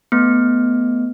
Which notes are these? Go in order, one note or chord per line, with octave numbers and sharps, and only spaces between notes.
A3 B3